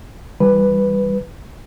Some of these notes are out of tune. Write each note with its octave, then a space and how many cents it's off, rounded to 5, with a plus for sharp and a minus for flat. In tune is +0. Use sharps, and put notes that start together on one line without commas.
E3 +5 G3 +5 B4 +0